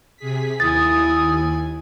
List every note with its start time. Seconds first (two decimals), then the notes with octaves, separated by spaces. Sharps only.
0.17 C3 G#4 B6
0.60 D#2 E4 G#5 D#6 A6